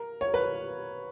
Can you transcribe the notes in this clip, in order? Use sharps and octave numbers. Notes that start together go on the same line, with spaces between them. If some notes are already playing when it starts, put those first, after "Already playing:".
Already playing: A#4
C#5
B4